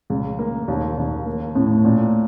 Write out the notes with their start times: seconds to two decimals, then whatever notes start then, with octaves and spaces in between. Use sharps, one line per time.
0.10 C#2
0.39 A#3
0.68 D#2
0.98 D#2
1.26 A#3
1.55 A2
1.85 A#2